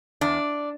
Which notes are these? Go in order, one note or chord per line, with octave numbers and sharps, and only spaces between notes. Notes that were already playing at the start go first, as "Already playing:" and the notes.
E2 D4